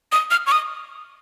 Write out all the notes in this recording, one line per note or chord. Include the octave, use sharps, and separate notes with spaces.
D#6
F6
C#6
D#6